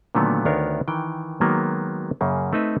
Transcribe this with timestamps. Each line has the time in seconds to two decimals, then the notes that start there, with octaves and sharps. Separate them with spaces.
0.15 A#2 D3 D#3 F#3 A3 B3
0.45 D2 D#3 B3 D4 A#4 C#5
0.88 D#3 E3 G5
1.41 D#3 F#3 G#3 A#3 B3
2.21 F#2 C#3 A#3
2.53 A3 C4 D#4 B4 E5